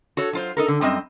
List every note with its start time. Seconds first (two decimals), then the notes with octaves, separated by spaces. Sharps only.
0.17 F#4 A4 C#5
0.33 F#3 F4 C5
0.57 D#4 A4 A#4
0.68 D3
0.81 F#2 G3 C4 D#5